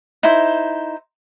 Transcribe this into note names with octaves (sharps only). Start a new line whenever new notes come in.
D#4 E4 C5